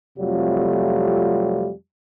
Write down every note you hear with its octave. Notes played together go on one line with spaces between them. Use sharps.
F2 C3 F#3 G3 A3 F4